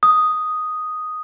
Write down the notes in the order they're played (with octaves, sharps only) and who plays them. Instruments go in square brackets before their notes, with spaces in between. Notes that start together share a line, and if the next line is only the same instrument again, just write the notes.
[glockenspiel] D#6